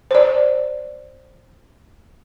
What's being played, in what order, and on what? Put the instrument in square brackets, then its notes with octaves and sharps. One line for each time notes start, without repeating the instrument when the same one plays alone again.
[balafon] C5 D5